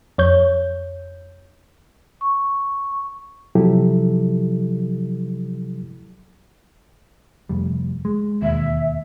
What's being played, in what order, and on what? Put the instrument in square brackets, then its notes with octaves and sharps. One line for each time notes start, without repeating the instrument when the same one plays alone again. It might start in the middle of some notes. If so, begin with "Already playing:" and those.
[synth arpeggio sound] F2 C#5 G6
[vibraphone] C#6
[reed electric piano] C3 F3 F#3 E4 G4 A4
[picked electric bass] F1 G3
G#3
[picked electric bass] E1 D#2 [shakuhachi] E5